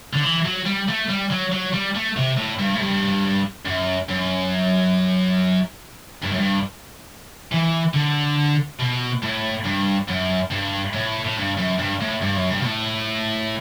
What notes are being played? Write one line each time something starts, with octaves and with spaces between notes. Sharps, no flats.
D3
E3
F#3
G3
A3
G3
F#3
F#3
G3
A3
C3
A2
G2
A2
G2
F#2
F#2
G2
F#2
G2
E3
D3
B2
A2
G2
F#2
G2
A2
A2
G2
F#2
G2
A2
G2
F#2
G2
B2
A2